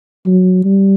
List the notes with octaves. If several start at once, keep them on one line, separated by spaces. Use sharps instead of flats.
F#3
G3